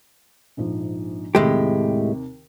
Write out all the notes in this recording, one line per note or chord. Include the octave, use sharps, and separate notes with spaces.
A#1 G#2 F3
D#2 A2 C3 G#3 G4